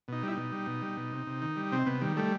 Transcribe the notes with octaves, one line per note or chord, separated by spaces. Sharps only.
B2 D#4
G3 E4
B2 D#4
G3
B2
G3
B2
C3
C3
D#3
G3
C3 C4
C3 B3
D#3 G3
G3 A3